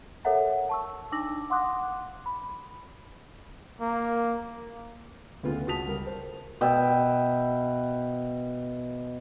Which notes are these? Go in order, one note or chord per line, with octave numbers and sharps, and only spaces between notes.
A4 A#4 C#5 E5 F#5 A#5
A5 C#6 E6
D4 D#4 D6 E6 A#6 F#7
F5 F#5 C6 D6 D#6 F#6
B5
A#3
D2 C#3 B3 F4
C#2 F#4 A5 D#6 B6 F7
G3 A#4
C5
B2 E5 G5